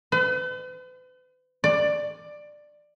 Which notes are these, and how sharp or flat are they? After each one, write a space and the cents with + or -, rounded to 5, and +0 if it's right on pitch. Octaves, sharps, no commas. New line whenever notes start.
B4 +45
D5 +15